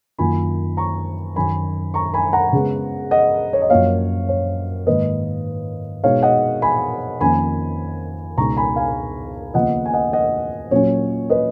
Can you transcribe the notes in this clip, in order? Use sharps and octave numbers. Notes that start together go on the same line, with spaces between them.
F#2 D#3 A#3 F4 G#5 B5
A#5 C#6
F#2 D#3 F#3 G#5 B5
A#5 C#6
G#5 B5
F#5 A#5
C#3 G#3 B3
D#5 F#5
C#5
D#5
F#2 F3 A#3 C#5 F5
C#5
G#2 D#3 A#3 B4 D#5
B2 G#3 B3 D#4 C#5 F5
D#5 F#5
G#5 B5
F2 D#3 A#3 C#4 G#5 B5
C#2 B2 G#3 D#4 A#5 C#6
G#5 B5
F5 G#5
D#2 C#3 F3 B3 F4 D#5 F#5
G#5
D#5 F#5
D#5 F#5
A#2 F#3 C#4 C#5
B4 D#5